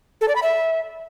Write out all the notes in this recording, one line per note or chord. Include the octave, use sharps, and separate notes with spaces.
A4
D5
B5
E5